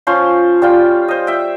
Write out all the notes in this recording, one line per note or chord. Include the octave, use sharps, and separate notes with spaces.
F3 C#4 C5 C6
G3 F4 G5
C5 D#5
E5 G5